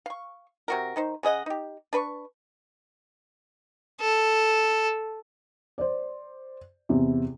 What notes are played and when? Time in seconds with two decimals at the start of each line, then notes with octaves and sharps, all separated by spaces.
0.06 F5 C#6
0.68 C3 F#4 A#4
0.96 D#3 D#4 C5
1.23 C#3 G#4 D#5 F#5
1.46 D#4 G4
1.93 D4 B4 B5 C#6
4.01 A4
5.78 C5 D5
6.89 E2 C3